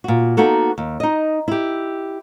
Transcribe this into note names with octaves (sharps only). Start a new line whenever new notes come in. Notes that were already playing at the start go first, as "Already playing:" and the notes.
A#2 F#4
A#3 B3 D#4 F#4 A4
D#2
D#4 D#5
E4 G4